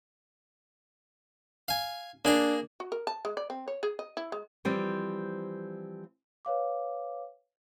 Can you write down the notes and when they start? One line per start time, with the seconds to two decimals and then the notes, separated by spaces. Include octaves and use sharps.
1.68 F5 G#5
2.25 A#3 D4 G#4 A#5
2.80 F#4
2.92 A#4
3.07 A5
3.25 G#3
3.37 D5
3.50 C4
3.68 C#5
3.83 G#4
3.99 D#5
4.17 E4
4.32 G#3
4.65 E3 F3 G3 C4
6.45 B4 C#5 F5 D6